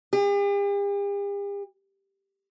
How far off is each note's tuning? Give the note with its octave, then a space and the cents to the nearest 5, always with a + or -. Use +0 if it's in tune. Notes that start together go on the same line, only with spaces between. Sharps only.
G4 +45